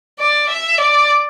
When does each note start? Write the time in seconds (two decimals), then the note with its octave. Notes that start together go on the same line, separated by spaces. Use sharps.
0.19 D5
0.49 E5
0.78 D5